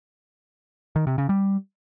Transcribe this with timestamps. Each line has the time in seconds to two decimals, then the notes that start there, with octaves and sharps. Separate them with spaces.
0.96 D#3
1.07 C3
1.18 C#3
1.29 G3